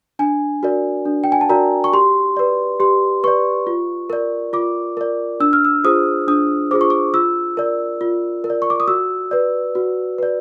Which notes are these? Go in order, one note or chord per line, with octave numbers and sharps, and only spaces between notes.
D4 G#5
F#4 A#4 D5
D4
G5
G#5
A5
F#4 A#4 D5 A#5
C#6
G4 C6
B4 D5
G4 C6
B4 D5 C#6
F4
A#4 D5
F4 D6
A#4 D5
D4 E6
F6
E6
F4 G#4 C5 D#6
D4 D#6
F4 G#4 C5 D6
C#6
D6
F4 E6
A#4 D5
F4
A#4
D5
C#6
D6
D#6
F#4 E6
B4 D5
F#4
B4 D5